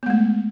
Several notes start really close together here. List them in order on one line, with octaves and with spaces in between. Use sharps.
B3 G#3 A3